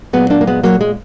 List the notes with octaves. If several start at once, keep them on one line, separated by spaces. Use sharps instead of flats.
A#2 F#3 G#3 B3
A#3 D4
A#3
G#3 B3
F#3 A#3
G#3